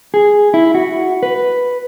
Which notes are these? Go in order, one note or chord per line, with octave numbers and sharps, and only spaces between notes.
G#4
E4
F#4
B4